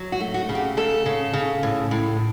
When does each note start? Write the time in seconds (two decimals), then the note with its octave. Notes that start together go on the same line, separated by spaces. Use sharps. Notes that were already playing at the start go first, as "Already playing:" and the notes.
Already playing: F#3
0.12 F#4
0.20 A3
0.34 F#4
0.49 C#3
0.55 G4
0.77 C#3 A4
1.06 C#3
1.33 C#3
1.63 A2
1.91 A2